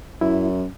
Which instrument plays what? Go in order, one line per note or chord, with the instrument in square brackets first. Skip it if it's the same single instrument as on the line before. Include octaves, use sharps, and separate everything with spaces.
[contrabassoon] F#2 [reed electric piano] E4